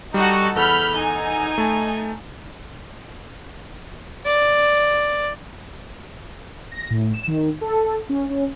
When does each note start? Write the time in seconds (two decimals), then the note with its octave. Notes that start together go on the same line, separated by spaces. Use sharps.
0.14 G3 D#4 F#4 A4
0.56 E2 A4 F#5 B5 F6 G6
0.96 D#4 G#5
1.58 A3 A5
4.26 D5
6.72 A#6
6.90 A2
7.14 E7
7.27 D#3
7.61 A4
8.09 C#4
8.30 C#4